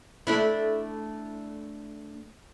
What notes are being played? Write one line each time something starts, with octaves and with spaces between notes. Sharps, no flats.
A3 D4 E4